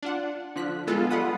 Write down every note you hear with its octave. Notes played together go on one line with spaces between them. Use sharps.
D4 F4 F#5
D3 F3 F#6 B6
G#3 B3 F4 A4
G3 F4 F#5 B5 D#6